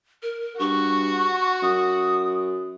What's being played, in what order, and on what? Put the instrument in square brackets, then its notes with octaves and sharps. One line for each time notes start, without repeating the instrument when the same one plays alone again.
[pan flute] A#4
[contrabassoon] G2 [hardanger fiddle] F#4 [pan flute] C#6
[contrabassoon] F#2 [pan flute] D#6